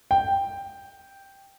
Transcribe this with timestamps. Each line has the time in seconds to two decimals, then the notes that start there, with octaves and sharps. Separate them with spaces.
0.11 G5